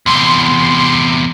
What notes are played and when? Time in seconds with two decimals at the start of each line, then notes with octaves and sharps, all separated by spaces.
0.06 E2 C3 C6